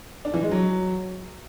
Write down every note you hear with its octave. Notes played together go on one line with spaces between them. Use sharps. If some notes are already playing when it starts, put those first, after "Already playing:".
D4
E3
G#3
F#3